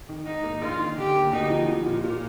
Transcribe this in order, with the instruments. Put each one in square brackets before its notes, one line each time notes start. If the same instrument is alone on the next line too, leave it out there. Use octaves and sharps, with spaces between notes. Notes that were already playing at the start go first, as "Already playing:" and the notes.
[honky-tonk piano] D#3
[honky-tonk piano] G#2 [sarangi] D#4
[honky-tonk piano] A#3
[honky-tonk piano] A#1 [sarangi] F4
[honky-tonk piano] D#3
[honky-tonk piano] D3 [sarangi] G4
[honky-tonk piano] A#3
[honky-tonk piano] D2 [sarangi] D#4
[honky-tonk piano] F3
F3
A#2
A#2